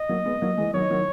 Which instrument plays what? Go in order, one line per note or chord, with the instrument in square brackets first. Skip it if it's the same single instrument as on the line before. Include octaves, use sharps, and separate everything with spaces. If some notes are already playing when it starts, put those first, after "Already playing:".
Already playing: [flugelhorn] D#5
[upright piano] F#3 A#3
G#3 B3
F#3 A#3
E3 G#3
[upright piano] D#3 F#3 [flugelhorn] C#5
[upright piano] D#3 F#3